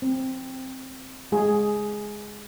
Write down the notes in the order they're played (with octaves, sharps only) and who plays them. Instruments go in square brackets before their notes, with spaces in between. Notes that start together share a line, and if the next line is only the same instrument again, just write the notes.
[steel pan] C4
G#3 G#4